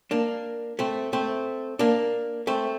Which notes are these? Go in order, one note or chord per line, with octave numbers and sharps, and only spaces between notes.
A#3 D4
A3 C4
A3 C4
A#3 D4
A3 C4